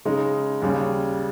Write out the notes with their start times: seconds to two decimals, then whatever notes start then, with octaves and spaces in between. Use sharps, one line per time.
0.05 C#3 G#3 D#4
0.62 D#2 C#3 G3